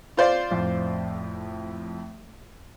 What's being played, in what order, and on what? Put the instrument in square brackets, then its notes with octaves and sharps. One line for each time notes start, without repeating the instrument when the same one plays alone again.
[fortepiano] F4 C5 D5
[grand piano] F2 A2